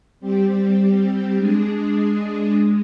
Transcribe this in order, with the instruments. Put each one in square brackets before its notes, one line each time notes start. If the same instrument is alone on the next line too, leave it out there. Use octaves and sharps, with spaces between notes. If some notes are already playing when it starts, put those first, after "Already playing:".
[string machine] G3 C4 G4
G#3 D4 G#4
G#3